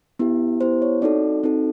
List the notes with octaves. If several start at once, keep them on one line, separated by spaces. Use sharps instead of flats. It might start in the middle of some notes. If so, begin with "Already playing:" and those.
B3 E4 G4
B3 E4 G4 C5
C#5
C4 D#4 F#4 A4 D5
C4 D#4 F#4 A4